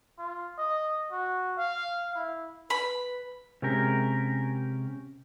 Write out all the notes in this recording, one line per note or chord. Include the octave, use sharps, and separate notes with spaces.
F4
D#5
F#4
F5
E4
B4 B5
C3 G#3 C#4 G4 A#4